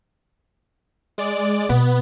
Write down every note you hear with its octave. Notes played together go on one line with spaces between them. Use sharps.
G#3 D5 D7
B2 B3